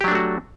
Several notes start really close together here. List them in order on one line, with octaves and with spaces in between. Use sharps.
G4 F#3 D4 A3 F#4